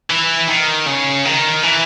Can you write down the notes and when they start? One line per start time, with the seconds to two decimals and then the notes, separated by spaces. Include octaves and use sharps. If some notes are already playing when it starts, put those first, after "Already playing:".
0.10 E3
0.48 D#3
0.86 C#3
1.25 D#3
1.63 E3